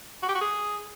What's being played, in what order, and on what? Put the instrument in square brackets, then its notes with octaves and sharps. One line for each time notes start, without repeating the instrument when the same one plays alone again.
[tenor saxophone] F#4
G4
F#4
G#4